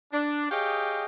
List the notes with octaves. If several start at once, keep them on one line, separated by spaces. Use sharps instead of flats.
D4
G4 G#4 C#5 D#5 F5 G5